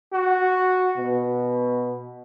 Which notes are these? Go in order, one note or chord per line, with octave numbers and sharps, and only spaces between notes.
F#4
B2